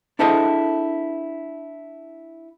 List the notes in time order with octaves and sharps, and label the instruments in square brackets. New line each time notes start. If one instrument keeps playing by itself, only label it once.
[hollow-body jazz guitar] D4 E4 G#4 A4 C5 D#5